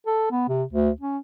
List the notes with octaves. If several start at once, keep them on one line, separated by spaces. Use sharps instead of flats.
A4
B3
C3
D2
C#4